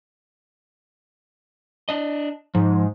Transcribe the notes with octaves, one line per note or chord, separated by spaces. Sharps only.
D4 D#5
G#2 F3